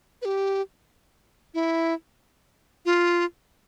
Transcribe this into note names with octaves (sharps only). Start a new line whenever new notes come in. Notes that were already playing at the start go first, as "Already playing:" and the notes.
B4
G4
E4
F4